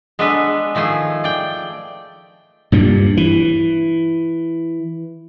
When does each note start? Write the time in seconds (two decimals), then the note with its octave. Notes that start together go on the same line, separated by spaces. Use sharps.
0.19 G#3 B3 D4 A4 B4
0.75 D#3 F3 A3 G#4
1.24 D5 G5
2.72 G2 A#2 G3
3.17 E3